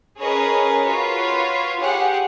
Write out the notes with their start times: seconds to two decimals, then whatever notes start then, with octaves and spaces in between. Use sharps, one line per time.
0.17 C#4 G#4 A#4 B4 C#5 D#5
0.85 F4 F#4 B4 C#5
1.79 G4 G#4 F#5